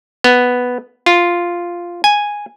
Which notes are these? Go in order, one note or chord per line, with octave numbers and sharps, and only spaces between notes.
B3
F4
G#5